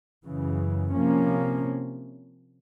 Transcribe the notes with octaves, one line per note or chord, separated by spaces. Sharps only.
F#2 C#3 E3
C3 F3 A#3 C#4